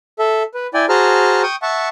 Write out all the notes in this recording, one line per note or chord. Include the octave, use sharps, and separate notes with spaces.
A4 E5
B4
E4 D5 G5 G#5
F#4 G#4 C5 A5 A#5 F6
G5 C#6 D#6
E5 F#5 A5 C#6